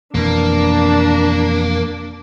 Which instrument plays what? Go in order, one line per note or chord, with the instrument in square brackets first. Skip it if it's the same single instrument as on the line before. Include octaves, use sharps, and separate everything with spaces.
[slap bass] F2 B2 E3 [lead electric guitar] A#3 [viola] D4